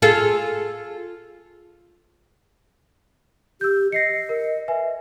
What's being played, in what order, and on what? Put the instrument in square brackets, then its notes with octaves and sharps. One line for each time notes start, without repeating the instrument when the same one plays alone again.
[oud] F4 G#4 A4
[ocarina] G4 [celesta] E6 G6
[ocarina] D#5 [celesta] A#6 C7 C#7
[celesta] A#4
B4 E5 G#5